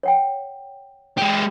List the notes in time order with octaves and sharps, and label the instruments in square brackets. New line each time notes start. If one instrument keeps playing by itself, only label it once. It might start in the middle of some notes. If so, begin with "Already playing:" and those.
[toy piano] C#5 F#5 G5
[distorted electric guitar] G#3 G4